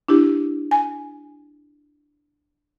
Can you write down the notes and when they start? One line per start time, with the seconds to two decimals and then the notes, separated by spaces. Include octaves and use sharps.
0.08 D4 E4 G4
0.71 G#5